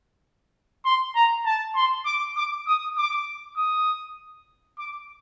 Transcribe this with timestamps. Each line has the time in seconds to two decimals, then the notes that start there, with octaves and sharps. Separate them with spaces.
0.85 C6
1.15 A#5
1.46 A5
1.75 C6
2.05 D6
2.36 D6
2.67 D#6
2.97 D6
3.57 D#6
4.78 D6